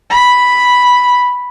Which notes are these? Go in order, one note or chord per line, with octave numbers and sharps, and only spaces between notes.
B5